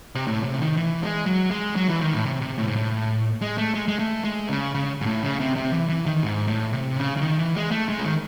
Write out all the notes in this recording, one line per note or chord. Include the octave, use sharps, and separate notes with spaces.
C3
A2
C3
C#3
D#3
E3
G#3
F#3
G#3
F#3
E3
D#3
A2
C3
C3
A2
G#2
A2
G#3
A3
G#3
G#3
A3
G#3
C#3
C#3
G#2
A2
C#3
C3
C3
E3
E3
D#3
G#2
A2
C3
C#3
C#3
D#3
E3
G#3
A3
G#3
C#3
D#3